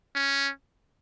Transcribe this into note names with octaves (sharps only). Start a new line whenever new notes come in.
C#4